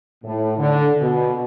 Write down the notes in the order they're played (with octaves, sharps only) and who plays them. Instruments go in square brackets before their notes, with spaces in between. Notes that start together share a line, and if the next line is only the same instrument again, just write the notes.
[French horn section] A2
D3
B2